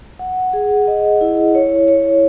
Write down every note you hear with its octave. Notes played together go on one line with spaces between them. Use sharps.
F#5
G#4
D#5
E4
C#5
C#5